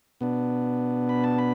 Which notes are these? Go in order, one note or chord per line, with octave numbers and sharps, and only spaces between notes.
B2 B3 D4
B5
A5
B5